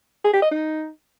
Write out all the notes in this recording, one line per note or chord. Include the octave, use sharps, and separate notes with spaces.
G#4
G4
D#5
D#4